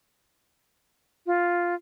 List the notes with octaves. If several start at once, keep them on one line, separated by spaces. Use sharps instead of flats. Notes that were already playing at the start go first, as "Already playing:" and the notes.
F4